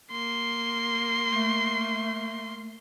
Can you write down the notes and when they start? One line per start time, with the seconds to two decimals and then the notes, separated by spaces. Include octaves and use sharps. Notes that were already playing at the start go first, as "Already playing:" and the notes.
0.11 A#3 C6
1.31 A3